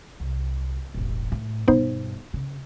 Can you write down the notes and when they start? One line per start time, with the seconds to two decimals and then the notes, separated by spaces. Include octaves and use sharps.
0.20 C2
0.94 E1 A1
1.32 A2
1.68 G2 B2 B3 D#4 C5
2.34 C#3